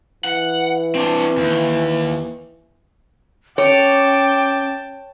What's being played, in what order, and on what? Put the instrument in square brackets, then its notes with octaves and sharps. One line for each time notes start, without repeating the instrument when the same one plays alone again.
[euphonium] E3 [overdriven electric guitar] F#5
[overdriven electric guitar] C4 D4
D#2
[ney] C#4 [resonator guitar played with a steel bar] C#5 [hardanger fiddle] G5 A5 [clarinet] D6